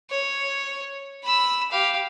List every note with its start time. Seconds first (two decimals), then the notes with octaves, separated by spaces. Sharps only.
0.10 C#5
1.24 B5 E6
1.71 G4 F5